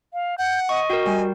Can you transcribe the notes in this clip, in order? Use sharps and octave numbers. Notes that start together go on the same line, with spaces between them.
F5
F#5 G6
D#5 C#6
F#4 A#4 G5
G3 G#5